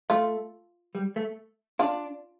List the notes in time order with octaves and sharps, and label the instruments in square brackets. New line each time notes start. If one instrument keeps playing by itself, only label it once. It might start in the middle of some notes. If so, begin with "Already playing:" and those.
[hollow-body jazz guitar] A3 [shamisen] F4
[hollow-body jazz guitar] G3
A3
[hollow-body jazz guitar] D4 [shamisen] F4